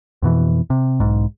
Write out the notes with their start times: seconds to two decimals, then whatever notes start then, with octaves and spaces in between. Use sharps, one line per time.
0.22 F2 B2 E3
0.70 C3
1.00 B1 G#2